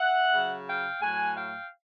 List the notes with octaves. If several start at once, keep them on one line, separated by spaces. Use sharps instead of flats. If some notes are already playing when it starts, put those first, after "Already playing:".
Already playing: E5 F#5
C#3 F#3
F5 G5
A2 F#3 F#5 G#5
F5 G5